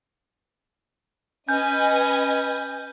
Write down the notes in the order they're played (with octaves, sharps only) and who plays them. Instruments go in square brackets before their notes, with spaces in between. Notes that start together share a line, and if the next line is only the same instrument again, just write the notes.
[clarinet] C#4 [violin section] B4 D#5 G#5 [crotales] G6